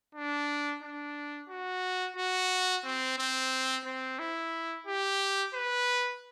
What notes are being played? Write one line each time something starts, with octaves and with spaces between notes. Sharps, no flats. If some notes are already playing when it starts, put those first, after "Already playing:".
D4
D4
F#4
F#4
C4
C4
C4
E4
G4
B4